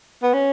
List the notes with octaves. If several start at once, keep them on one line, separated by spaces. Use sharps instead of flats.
B3
C#4